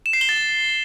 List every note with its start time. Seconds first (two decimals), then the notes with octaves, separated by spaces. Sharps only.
0.06 E7
0.13 C7
0.21 G7
0.29 A6